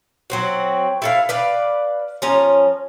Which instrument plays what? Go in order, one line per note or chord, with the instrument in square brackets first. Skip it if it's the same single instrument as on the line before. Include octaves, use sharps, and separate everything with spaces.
[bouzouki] F#3 C4 F#4
E4 A4 F5
B4 D5 F5
F3 C#4 A#5